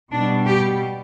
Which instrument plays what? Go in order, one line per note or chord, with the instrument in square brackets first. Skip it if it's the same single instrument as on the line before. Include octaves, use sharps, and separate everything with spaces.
[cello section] B2 G3 D4
G4